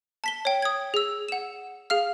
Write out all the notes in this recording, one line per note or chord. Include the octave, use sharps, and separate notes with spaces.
A5 B6 G7
C#5 G5
D#6 G#6
G#4 E6
F#5 E7
G#4 F5 F6